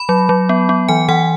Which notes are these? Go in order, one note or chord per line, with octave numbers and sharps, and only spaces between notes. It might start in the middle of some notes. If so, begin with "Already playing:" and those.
Already playing: B5
F#3
F#3
B3
B3
E3 G#5
E3 F#5